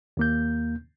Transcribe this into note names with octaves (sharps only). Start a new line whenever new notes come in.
D#2 A#3 G6